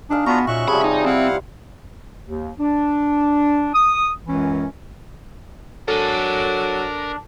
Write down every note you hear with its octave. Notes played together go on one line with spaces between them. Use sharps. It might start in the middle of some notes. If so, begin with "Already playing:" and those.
D4 D#4 G#4 F5
B3 D4 F4 F#4 A#5
A#2 C#4 F#4 E5 C#6 F#6
C3 F3 G3 G#4 B5
D#4
C4 E4 F5 F#5
D#2
D4
D#6
C#2 F#2 E3 C#4
F#3 D4 A4 A#4 G#5